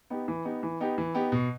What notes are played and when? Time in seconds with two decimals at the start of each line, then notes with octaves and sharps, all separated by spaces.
0.10 B3 D#4 G4
0.28 E3
0.44 B3 D#4 G4
0.63 E3
0.80 B3 D#4 G4
0.98 E3
1.14 B3 D#4 G4
1.32 B2